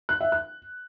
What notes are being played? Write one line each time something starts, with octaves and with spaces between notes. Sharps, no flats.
F#6
E5
F#6